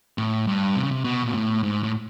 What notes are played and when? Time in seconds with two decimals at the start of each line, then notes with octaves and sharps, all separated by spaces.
0.18 A2
0.47 G2
0.75 C3
0.83 C#3
0.91 C3
1.04 B2
1.23 A#2
1.34 A2
1.63 G#2
1.83 A2